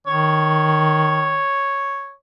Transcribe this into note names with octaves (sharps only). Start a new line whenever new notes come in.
D#3 C#5